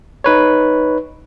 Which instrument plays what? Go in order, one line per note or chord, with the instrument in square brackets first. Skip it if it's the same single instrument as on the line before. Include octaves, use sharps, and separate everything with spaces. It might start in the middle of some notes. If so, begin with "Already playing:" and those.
[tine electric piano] D#4 B4 C#5